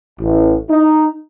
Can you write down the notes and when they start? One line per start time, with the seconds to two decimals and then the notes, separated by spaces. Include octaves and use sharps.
0.19 A1
0.69 D#4